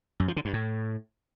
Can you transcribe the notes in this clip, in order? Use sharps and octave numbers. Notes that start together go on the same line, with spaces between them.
F#2
F3
D3
G2
A2